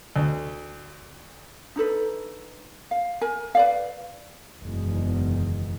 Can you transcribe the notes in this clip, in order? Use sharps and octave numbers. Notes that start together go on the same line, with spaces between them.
D2
D4 D#4 A4 B4
F5
A#4 G#5
B4 D5 F5
F#1 E2 B2 D#3 G#3